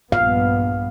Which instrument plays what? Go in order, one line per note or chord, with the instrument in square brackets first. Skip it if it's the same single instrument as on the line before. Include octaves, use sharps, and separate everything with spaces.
[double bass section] A#1 G2 B3 [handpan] F5